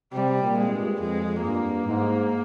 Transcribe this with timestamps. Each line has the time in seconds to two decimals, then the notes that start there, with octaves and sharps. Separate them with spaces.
0.13 C3 G3
0.42 A#2
0.57 G#3
0.71 G2
1.00 F2 G#3
1.42 G2 A#3
1.85 G#2